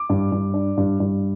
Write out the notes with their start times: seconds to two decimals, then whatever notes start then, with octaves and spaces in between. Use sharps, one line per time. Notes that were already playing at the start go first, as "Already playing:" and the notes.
Already playing: D6
0.09 G2
0.32 G2
0.54 D4
0.77 G2
1.00 G2